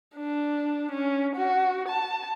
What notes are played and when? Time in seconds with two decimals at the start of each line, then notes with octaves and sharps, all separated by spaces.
0.15 D4
0.91 C#4
1.35 F#4
1.88 A5